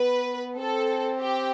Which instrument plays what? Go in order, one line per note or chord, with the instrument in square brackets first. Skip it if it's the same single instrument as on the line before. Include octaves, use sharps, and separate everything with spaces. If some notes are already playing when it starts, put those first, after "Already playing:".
Already playing: [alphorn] B3 [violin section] B4
[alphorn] C4 [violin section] A4
[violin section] G4